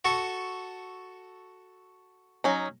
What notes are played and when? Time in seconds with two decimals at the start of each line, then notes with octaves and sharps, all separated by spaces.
0.05 F#4 A4 C#6
2.44 F#3 C#4 D#4